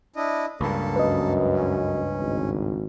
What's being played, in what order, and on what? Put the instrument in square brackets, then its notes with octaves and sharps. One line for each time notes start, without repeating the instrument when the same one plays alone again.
[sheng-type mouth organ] D4 E4 D#5
[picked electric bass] C#2 G2 [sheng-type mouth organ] A#3 A4
[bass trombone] F#2 [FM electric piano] B4 D#5
[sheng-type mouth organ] C#4
[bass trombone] G#1